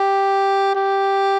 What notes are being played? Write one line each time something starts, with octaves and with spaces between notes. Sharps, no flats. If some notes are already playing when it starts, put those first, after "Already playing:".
Already playing: G4
G4